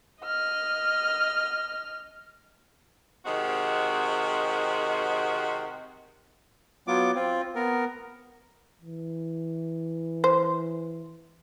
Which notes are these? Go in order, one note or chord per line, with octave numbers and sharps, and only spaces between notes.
D#5 F6
C3 D#3 G#3 C4 F#4
F#3 B3 F4 D6
C4 F4
B3 A#4
E3
C5